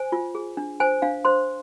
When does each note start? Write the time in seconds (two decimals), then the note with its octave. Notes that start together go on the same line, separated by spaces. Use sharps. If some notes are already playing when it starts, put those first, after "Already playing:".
Already playing: C5 G#5
0.12 F4
0.35 G#4
0.57 D4
0.80 C5 G#5
1.02 D4 F5
1.25 C5 C6